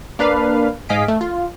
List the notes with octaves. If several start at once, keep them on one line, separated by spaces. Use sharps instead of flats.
A#3 D4 B4 F5
G#2 D#5 F5 G#5 B6 D7
A3
F4